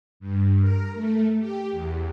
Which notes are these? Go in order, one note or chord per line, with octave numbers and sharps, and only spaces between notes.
G2
A#4
A3
G4
E2